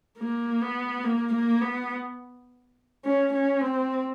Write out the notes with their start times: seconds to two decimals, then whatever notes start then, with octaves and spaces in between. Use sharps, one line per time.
0.18 A#3
0.62 B3
1.04 A#3
1.33 A#3
1.62 B3
3.05 C#4
3.33 C#4
3.61 C4